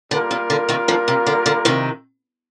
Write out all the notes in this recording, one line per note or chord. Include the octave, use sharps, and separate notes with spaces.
D3 G3 A#3 F4 A#4
C3
D3
C3 D#3
D3 F3
C3
D3
D3
C3 D#3